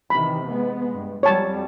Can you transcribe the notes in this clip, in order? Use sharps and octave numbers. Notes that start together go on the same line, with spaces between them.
C3 D#3 E3 B5
G#3 B3
G2
F2 F#3 G3 C#5 A5